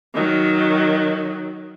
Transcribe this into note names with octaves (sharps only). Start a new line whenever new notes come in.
D#3 F#3